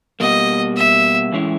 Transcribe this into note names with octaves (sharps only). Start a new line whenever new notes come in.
B2 G3 A#3 D#5
E5
A2 E3 G#3 C#4 E4